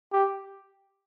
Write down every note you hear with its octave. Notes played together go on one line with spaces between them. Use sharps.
G4